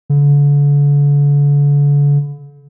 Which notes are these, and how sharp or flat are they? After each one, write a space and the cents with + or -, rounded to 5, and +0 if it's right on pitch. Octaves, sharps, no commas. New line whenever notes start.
D3 -40